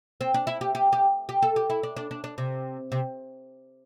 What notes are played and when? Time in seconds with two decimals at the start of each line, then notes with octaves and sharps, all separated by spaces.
0.21 C4
0.34 D4
0.47 E4
0.61 G4
0.75 G4
0.93 G4
1.29 G4
1.42 A4
1.56 G4
1.70 E4
1.83 D4
1.97 D4
2.11 D4
2.24 D4
2.38 C3
2.92 C3